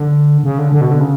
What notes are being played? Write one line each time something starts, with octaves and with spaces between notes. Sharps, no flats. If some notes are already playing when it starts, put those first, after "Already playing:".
Already playing: D3
C#3
D3
D3
B2
D3
C#3